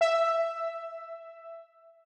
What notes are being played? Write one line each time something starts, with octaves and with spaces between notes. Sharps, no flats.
E5 E6